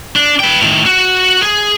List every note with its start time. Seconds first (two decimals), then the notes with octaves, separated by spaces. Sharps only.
0.16 D4
0.40 B4 G5
0.61 A2 D#3
0.86 F#4
1.43 G#4